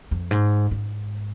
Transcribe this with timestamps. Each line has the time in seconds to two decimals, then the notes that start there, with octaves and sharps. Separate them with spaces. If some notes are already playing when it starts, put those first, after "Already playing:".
0.11 F2
0.31 G#2
0.71 G#2